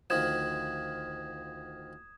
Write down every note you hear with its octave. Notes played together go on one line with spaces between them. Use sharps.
D2 D#3 F3 D#6 G#6 E7